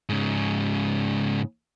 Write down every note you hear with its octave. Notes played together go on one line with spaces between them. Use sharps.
G#2 C#3